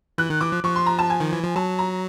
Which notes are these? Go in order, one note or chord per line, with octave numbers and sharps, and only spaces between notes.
E3 F#6
D#3
E3 D6
F3
F3 C#6
C6
A#5
A5
G#5
D#3
E3
F3
F#3 A5
A#5